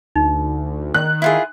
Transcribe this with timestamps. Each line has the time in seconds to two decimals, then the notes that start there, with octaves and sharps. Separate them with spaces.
0.16 D2 D#4
0.94 D#3 F#6
1.22 E4 F4 G#4